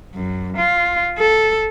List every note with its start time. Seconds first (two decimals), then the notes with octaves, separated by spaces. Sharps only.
0.15 F#2
0.58 F4
1.18 A4